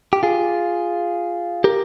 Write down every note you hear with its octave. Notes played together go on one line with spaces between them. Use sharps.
G4
F4 G#4
G4 A#4